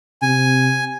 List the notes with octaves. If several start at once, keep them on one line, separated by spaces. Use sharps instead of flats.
C3 G#5